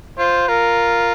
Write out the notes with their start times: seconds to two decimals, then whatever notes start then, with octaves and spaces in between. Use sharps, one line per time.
0.19 F4 C5
0.48 F4 A#4